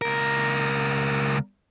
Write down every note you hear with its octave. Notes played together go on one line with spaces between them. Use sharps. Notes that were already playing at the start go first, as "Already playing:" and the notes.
C#2 A#4